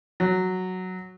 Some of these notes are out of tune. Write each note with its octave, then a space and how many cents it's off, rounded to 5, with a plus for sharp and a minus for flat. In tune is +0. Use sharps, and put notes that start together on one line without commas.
F#3 +0